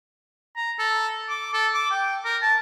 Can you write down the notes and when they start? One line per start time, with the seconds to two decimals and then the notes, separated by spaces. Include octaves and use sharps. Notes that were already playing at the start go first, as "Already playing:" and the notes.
0.56 A#5
0.79 A4
1.29 D6
1.53 A4
1.74 D6
1.91 G5
2.25 A#4
2.42 A5